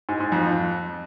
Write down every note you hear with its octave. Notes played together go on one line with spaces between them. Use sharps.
G#2
G#2
F2